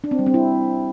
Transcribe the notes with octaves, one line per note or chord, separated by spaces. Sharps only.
D4
C4
G3
C4
E4